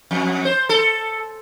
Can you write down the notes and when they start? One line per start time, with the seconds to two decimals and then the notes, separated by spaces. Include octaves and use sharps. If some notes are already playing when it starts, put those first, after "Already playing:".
0.11 F2
0.45 C5
0.69 A4